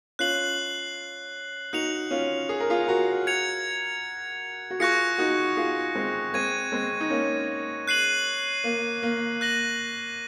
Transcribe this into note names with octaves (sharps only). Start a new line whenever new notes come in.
C#4 F4 F#6 C7 F#7
D#4 F#4 F#6 C#7 F7
C#4 F4
G#4
A#4
F4 G#4
F#4 A#4
G#6 C#7 F7
F#4
F4 G#4 C#6 F#6 A#6 C#7
D#4 F#4
F4 G#4
G#3 C4
G#3 C4 C#6 G#6 D#7
G#3 C4
D#4
A#3 C#4
F#6 C7 D#7 F#7
A#3
A#3
F#6 A#6 D#7 F#7